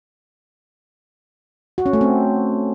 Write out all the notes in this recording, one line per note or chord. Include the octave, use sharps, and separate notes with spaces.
F#4
C#4
A3
C4